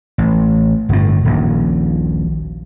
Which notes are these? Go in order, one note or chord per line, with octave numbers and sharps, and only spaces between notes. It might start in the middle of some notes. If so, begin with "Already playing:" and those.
A1
G1 A2
D#1 A#1 D#2